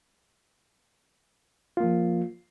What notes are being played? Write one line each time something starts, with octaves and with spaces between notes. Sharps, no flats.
F3 A#3 F4